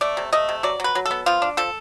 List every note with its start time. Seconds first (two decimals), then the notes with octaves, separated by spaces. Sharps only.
0.01 A3 D5
0.17 C3
0.33 A3 D#5
0.49 C3
0.63 F#3 D5
0.80 F#3 B4
0.95 F#3
1.06 A4
1.11 B3
1.26 F3 F4
1.42 D4
1.57 F3 A4